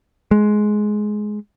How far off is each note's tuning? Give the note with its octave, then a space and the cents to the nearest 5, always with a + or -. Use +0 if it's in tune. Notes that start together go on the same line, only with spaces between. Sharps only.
G#3 +15